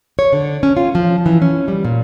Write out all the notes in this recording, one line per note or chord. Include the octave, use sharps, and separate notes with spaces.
C#5
D3
C#4
F4
F3
E3
C#4
G3
A#2